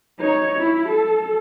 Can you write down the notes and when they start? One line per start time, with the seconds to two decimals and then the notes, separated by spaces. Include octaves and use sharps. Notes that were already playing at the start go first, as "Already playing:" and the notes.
0.20 D#4 C#5
0.59 E4
0.89 A4